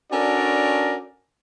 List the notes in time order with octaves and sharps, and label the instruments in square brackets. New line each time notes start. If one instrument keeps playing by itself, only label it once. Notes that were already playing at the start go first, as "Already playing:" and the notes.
[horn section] C#4 D4 F#4 A4 A#4 D5